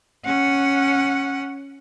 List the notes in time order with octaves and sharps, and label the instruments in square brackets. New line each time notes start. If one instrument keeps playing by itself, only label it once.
[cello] C#4 F#5